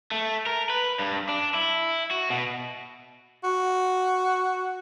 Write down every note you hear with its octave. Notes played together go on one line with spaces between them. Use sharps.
A3
A#4
B4
G2
D4
E4
F#4
B2
F#4